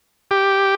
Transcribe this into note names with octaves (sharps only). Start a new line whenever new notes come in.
G4